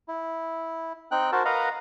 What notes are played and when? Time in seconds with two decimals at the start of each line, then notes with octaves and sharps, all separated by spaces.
0.08 E4
1.11 C4 D#4 G5 F#6
1.32 F#4 A#4 C5 A5
1.45 A#4 B4 D#5 F5 F#5 A#5